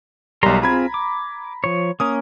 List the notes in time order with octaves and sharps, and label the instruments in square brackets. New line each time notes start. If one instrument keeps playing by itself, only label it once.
[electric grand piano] B1 G3 [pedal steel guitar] A#4 A#5 C6
[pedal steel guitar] C4 F4 G#4 [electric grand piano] A#5 B5 G#6
[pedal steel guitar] D6
F3 C#5
[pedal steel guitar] A#3 C#4 A#4 [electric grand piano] D#6